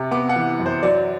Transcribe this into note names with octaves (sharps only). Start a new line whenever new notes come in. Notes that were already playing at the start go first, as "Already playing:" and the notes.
Already playing: C3
B3 D6
F#5
E3
F#2
C5
F#3 D5